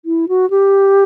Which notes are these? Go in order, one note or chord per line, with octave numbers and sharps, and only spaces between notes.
E4
F#4
G4